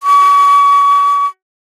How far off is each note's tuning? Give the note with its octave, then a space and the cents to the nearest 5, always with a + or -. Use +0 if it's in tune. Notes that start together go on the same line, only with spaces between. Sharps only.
C#6 +40